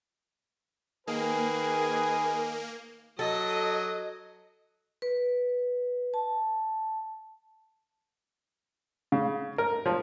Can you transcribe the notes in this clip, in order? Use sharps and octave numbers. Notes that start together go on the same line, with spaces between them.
D#3 A#3 G#4 B4
F#3 A4 D#5
B4
A5
C#3
A#4
F3